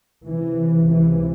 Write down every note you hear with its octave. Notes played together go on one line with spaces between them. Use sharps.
C#2 C3 E3
E3